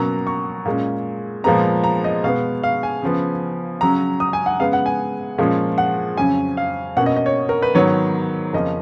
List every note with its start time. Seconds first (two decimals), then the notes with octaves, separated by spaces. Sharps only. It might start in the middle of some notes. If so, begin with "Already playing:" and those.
Already playing: B2 F#3 A#3 C#4 A#5
0.27 C#6
0.65 A#2 G#3 C#4
1.44 A#2 F3 G#3 B3 A#5
1.84 A#5
2.04 D#5
2.24 B2 G#3 B3 F5
2.63 F5
2.83 G#5
3.02 C#3 F3 B3
3.81 C#3 F#3 C#4 A#5
4.20 D#6
4.33 G#5
4.46 F#5
4.60 C#3 G#3 B3 F5
4.73 F#5
4.86 G#5
5.38 A#2 F3 G#3 C#4
5.78 F#5
6.17 F2 C#3 F#3 C#4 G#5
6.57 F5
6.97 B2 A#3 C#4 F#5
7.06 D#5
7.16 D#5
7.26 C#5
7.49 A#4
7.62 B4
7.74 G#2 D#3 F#3 B3 C#5
8.53 F2 C#3 F3 A#3 C#4 D#5